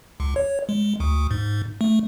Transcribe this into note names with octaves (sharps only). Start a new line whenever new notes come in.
C#2
C#5
G#3
D2
G#2
A3